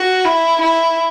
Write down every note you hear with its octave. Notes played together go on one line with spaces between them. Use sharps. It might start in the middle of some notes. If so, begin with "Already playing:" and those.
Already playing: F#4
E4
E4